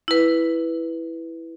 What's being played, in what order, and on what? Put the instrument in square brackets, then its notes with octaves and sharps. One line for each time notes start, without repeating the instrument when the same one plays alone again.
[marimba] E4 B4